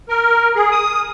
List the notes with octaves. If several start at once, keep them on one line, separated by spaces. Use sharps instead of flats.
A#4
G#4
D#6